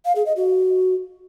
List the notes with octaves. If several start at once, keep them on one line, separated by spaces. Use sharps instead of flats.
F5
G#4
D#5
F#4